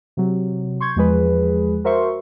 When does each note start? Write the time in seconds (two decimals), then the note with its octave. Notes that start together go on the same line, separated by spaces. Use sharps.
0.17 C3 F#3
0.80 C6 C#6 G6 G#6
0.96 E2 F3 G#3 G#4 B4
1.84 F#4 A#4 C5 E5 C6 C#6